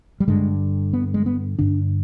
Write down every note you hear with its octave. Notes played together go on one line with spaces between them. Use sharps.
G3
G2 D3 G#3
B3
G#3
B3
G2 D3 D4